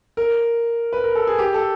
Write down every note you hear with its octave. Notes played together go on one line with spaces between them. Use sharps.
A#4
B4
A#4
A4
G#4
G4
A4